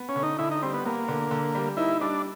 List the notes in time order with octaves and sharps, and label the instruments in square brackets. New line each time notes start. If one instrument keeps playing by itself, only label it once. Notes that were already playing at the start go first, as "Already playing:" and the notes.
Already playing: [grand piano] B3
[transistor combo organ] C#4
[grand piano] D3
[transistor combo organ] D#4
[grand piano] D3 [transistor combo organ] E4
[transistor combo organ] D#4
[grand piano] G3 [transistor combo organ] C4
[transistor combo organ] B3
[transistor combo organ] A#3 [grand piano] B3
[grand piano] D3
D3
G3
[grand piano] D#4 [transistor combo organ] E4
[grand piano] G3 [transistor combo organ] D4